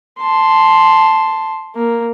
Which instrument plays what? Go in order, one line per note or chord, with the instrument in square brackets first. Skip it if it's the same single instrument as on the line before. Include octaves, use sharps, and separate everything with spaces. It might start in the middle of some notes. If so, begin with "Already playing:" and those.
[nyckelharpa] A5 C6
A#3